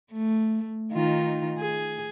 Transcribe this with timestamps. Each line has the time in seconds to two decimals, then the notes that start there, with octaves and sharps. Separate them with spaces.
0.13 A3
0.92 D#3 D#4 F4
1.58 G#4